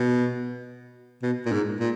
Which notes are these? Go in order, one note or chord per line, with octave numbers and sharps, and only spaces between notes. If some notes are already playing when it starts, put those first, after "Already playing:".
Already playing: B2
B2
A#2
G#2
A#2